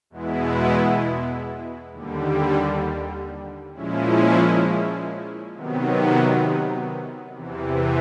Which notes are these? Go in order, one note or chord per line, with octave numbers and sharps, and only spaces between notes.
E2 B2 G#3 B3 E4
D#2 D3 G3
A#2 F3 G#3 C#4 E4
C3 D#3 F#3 B3
E2 C3 E3